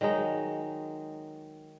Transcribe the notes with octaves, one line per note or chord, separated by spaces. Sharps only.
D#3 F#3 G#3 D#4